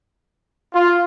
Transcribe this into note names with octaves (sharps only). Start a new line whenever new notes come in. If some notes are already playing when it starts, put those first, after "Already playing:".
F4